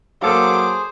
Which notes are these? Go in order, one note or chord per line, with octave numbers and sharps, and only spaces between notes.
F#3 A#3 G#4 A4 C5 F5 D6